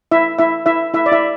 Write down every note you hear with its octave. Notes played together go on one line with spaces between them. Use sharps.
E4 E5
E4 E5
E4 E5
E4 E5
D5
E4 E5